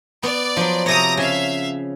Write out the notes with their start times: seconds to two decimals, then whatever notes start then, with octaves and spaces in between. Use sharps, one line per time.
0.23 B3 D5
0.57 F3 F#3
0.86 C3 C#5 A#5 D#6 A#6
1.17 C#3 E5 F5 G#5